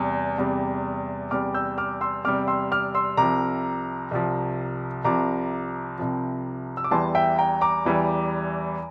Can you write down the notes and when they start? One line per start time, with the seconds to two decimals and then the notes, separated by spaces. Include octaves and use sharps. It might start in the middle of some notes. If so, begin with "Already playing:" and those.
Already playing: E2 C3 G3
0.38 E2 C3 G3
1.31 E2 C3 G3 D6 F6
1.54 E6 G6
1.78 D6 F6
2.01 C6 E6
2.25 E2 C3 G3 D6 F6
2.48 C6 E6
2.71 D6 F6
2.95 C6 E6
3.17 C2 C3 F3 A#5 D6
4.11 C2 C3 F3
5.04 C2 C3 F3 A#5 D6
5.98 C2 C3 F3
6.77 E6
6.84 D6
6.91 E2 E3 G3 A5 C6
7.15 E5 G5
7.38 G5 A#5
7.61 A#5 D6
7.85 E2 E3 G3